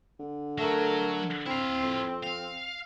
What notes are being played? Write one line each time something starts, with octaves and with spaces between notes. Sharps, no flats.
D3
F#3 A3 A#4
C4 E4 F5
F2
F5